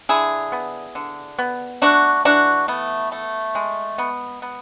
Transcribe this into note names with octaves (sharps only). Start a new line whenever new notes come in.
D3 E4 G#4
B3
D3
B3
A3 D4 F#4
E3 D4 F#4
A3 B3
A3
G#3
B3
B3